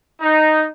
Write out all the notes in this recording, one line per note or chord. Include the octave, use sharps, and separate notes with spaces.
D#4